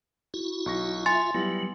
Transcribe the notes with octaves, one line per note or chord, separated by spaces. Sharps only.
E4 F#4
B1 C#6 A#6
F4 E5 G#5 C6 A6
F#3 G3 B3 E4